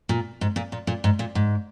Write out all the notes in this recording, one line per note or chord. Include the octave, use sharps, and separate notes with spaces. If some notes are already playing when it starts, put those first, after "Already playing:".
A#2
G#2
A#2
A#2
A#2
G#2
A#2
G#2